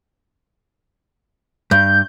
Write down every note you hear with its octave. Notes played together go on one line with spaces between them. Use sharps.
G2 G6